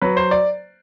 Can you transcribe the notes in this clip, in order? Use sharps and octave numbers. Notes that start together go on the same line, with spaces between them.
F#3 B4
C5
D5